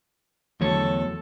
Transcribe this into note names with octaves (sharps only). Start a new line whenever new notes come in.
E2 D3 F#3 A3 A4 C#5 A5